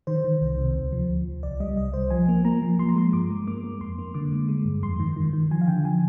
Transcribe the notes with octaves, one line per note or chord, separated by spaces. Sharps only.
D#3 C5
D#3
C2
C3
D2
F3
D2
D2
C2 D5
G3 D#5
C2 D#5
C2 C5
F3 G#5
A#3
A#3 A#5
F3
F3 C6
A#5
G#3 C6
G2 D6
G#3
A#3 D6
A#3
F2 C6
A#3
D3 D6
G#3
G#3
G2
F2 C6
D#3
D#3
D#3
F3 G#5
F5
D3 G5
F3 G#5